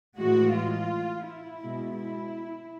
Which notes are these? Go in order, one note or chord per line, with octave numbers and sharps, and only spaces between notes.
A2 E3 G#3 F#4
F4
E4
B2 G#3
E4